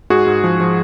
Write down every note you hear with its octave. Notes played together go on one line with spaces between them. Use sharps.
G#2 F#4 G#4
G#2
F3
F3